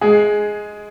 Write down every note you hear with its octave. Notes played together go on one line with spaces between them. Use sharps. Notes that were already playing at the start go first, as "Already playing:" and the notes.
G#3 G#4